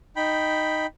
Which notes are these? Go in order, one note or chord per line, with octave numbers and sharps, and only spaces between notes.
D#4 G5 B5